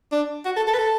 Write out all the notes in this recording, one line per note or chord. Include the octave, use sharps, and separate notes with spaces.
D4
F#4
A4
A4
B4
A4